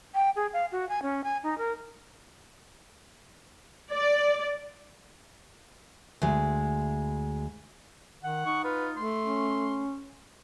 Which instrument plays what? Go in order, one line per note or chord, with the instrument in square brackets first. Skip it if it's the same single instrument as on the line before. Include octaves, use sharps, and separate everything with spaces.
[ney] G5
G#4
F5
F#4
G#5
C#4
G#5
D#4
A#4
[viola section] D5
[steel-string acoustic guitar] D2 G#3
[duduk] D#3 [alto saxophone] F#5
[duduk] D#4 [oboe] C#6
[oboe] F4 [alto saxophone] B4
[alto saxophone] A3 [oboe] C6
[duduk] C#4